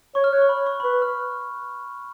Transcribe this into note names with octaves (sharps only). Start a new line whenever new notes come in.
C#5 C#6
F6
C#5 F#6
C#6
B5
C#6
B5
B4 C#6
F6